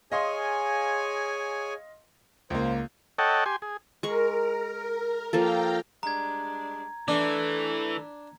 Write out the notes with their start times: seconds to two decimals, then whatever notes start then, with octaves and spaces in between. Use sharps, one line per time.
0.12 G#4 C#5 D#5 F5 G#5 C6
2.50 C#2 A#3 C5
3.19 A4 C#5 D#5 F#5 G5 A5
3.46 G4 G#5 C6
3.62 G#4
4.03 G#3 A#4 C#6
5.33 F3 A#3 A4 F5 G5 A#5
6.03 G3 G#3 D4 A#5 G#6
7.08 E3 A3 D4 A4